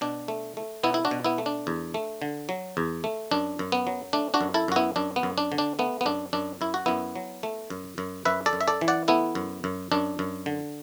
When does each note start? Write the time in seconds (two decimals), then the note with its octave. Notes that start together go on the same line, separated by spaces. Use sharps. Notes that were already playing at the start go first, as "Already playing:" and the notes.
0.01 B2 D4
0.28 A3
0.57 A3
0.83 B2 B3 E4
0.94 E4
1.05 D4 F#4
1.11 B2
1.24 B3 E4
1.38 A3
1.46 D4
1.67 E2
1.94 A3
2.22 D3
2.49 F#3
2.77 E2
3.04 A3
3.31 F#2 D4
3.59 F#2
3.72 B3
3.87 F#3
4.13 A3 D4
4.34 D4 F#4
4.41 F#2
4.54 E4 A4
4.68 F#2 F#4
4.76 B3 E4
4.96 F#2 D4
5.16 B3
5.23 F#2
5.38 D4
5.52 D3
5.58 D4
5.79 A3 B3
6.01 B3
6.06 F#2 D4
6.33 F#2 D4
6.61 F#2 E4
6.74 F#4
6.86 F#2 B3 E4
7.16 F#3
7.43 A3
7.70 F#2
7.98 F#2
8.25 F#2 B4 E5
8.46 A4 D5
8.53 F#2
8.61 E5
8.68 A4 D5
8.81 E3
8.88 D5 F#5
9.08 A3 B3 E4
9.35 F#2
9.64 F#2
9.92 F#2 D4
10.19 F#2
10.46 D3